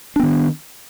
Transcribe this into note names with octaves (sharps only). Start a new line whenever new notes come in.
D#3 B3 D4